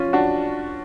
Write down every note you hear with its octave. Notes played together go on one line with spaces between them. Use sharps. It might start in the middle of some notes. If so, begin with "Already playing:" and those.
Already playing: C#4 F4
D4 F#4